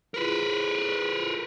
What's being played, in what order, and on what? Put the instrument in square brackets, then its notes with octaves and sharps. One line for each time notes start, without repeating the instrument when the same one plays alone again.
[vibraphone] E4 F4 G#4 [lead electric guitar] A#4 B4